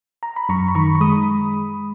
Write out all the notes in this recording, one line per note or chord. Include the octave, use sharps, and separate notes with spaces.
A#5
B5
F#2 A#5 C#6
B5
D#3 A#5 C#6
C#6
G#3 B5 D#6